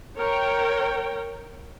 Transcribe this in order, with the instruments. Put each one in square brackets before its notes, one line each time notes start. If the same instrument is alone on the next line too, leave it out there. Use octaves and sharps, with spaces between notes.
[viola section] A#4 C#5 G5